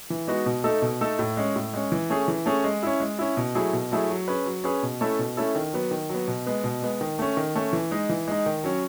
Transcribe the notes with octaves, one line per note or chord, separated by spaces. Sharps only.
E3
G#3 B3 D#4 F#4
B2
A3 D#4 A4
B2
A3 D#4 A4
A2
G#3 C#4
A2
G#3 C#4
E3
A3 C#4 G#4
E3
A3 C#4 G#4
G#3
C#4 E4
G#3
C#4 E4
B2
F#3 A3 E4 G#4
B2
F#3 A3 E4 G#4
F#3
C#4 G#4 B4
F#3
C#4 G#4 B4
B2
A3 C#4 E4 A4
B2
A3 C#4 E4 A4
D#3
F#3 B3
D#3
F#3 B3
B2
G#3 B3
B2
G#3 B3
D#3
A3 C#4
D#3
A3 C#4
E3
G#3 D#4
E3
G#3 D#4
D#3
F#3 C#4